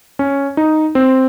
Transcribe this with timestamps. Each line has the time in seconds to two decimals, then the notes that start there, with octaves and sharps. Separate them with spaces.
0.19 C#4
0.57 D#4
0.95 C4